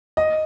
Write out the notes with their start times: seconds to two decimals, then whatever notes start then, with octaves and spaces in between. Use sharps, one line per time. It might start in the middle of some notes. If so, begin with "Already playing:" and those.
0.17 D#5